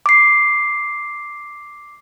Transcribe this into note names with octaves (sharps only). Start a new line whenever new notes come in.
D6 C7